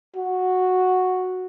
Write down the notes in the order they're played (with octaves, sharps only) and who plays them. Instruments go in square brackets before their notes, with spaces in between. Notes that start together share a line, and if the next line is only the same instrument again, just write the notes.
[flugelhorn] F#4